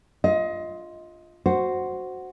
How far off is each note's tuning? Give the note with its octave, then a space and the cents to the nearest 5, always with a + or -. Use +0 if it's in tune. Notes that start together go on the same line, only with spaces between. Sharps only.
F4 +0 D#5 +25
F#4 +0 C5 +0